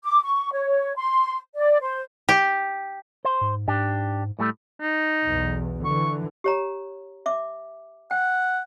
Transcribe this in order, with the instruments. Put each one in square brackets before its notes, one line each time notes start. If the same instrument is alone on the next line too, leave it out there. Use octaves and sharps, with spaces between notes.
[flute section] D6
C#6
C#5
C6
D5
C5
[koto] G4
[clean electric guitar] C5
[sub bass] G#2
[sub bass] G#2 [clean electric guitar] D4 G4
[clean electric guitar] A2 G3 A3
[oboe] D#4
[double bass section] B1 E2
[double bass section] D3 E3 [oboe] C#6
[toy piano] G4 C#5 A#5
E5 D6
[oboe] F#5 [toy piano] G5